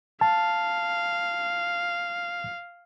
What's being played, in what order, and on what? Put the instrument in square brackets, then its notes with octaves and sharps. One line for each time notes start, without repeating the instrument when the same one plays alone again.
[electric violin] F5 [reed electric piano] A5